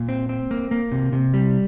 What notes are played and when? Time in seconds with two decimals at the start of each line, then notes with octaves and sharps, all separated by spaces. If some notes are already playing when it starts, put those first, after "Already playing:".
Already playing: A#2
0.09 C4
0.29 C4
0.51 A#3
0.71 A#3
0.92 C3
1.12 C3
1.34 G3